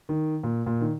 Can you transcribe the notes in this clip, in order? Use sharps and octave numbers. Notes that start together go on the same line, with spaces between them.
D#3
A#2
A#2
D#3